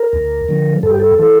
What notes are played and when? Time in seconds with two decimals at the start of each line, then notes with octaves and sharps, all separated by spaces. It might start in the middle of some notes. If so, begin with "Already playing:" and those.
Already playing: A#4
0.13 D2
0.48 D3 F3
0.83 G2 A4
0.91 G4
1.00 A4
1.19 E3 A4